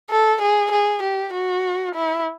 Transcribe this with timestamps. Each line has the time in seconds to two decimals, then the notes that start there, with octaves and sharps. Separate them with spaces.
0.11 A4
0.42 G#4
0.72 G#4
1.03 G4
1.33 F#4
1.95 E4